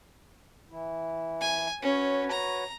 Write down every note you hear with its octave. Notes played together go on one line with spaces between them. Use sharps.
E3 E4
G#5
C#4 F#4 B4 C#5
A#5